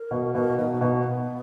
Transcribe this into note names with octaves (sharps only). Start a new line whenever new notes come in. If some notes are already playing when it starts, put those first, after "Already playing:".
Already playing: A#4
B2
B2 A#4
B2 D#4
B2 B3